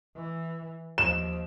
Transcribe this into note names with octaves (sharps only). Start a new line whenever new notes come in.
E3
D#2 F3 E7